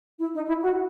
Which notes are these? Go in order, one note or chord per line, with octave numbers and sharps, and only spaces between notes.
E4
D#4
E4
F#4